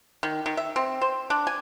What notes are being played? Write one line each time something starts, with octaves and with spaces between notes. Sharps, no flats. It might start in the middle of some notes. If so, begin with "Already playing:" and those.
D#3
D#3
E5
C4
C5
D4
G#5